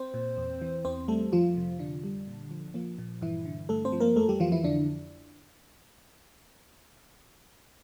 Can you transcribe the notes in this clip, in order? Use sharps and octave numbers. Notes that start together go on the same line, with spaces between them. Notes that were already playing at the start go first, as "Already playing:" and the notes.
Already playing: C4 C5
A#2
E2
E3
E2 C4 C5
G3 A3 A4
F2 F3 F4
C3
F2 D3 D4
G3
A#2
F3
F3 A#3
A#2
G2 E3 E4
D3
G2 A3 A4
C4 C5
F3
A#3 A#4
F2 A3 A4
G3 G4
E3 F3 F4
E3 E4
F2 D3 D4